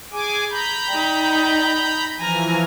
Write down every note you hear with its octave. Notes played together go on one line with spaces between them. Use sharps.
G#4 G#5 D6
A#5 B5 G6
D#4 D5 G5
E3 F3 G#5 A#5 F6